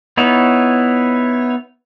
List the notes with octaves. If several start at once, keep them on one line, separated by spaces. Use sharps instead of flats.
B3 D#4 E4 C#5